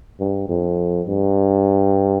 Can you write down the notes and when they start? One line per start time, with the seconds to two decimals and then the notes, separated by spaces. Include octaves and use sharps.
0.20 G2
0.49 F2
1.07 G2